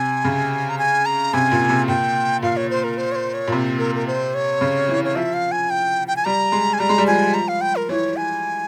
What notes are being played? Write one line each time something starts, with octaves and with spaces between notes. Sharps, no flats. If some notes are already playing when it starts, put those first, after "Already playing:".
Already playing: C3 G#5
C#3
A#5
G#5
A#5
C3 G#5
A#2
C3
A#2 G5
A#2 F5
C#5
C5
A#4
C5
C#5
C5
C#5
A#2
C3
A#4
A#4
C5
C#5
C#3
E3
C#5
F3 E5
F5
G#5
G5
G5
G#5
G3 A#5
G#3
G#5
G3 A#5
G#3
G3
F3 G#5
A#5
F5
G5
A#4
E3 C#5
G#5